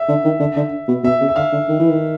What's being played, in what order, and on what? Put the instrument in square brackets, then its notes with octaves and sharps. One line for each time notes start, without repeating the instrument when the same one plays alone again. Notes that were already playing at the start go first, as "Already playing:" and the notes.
Already playing: [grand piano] E5
[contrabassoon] D3
D#3
D3
D3
B2
[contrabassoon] B2 [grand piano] E5
[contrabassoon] C#3
[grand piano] E5
[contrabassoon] D3 [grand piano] F5
[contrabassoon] D3
D#3
E3
D#3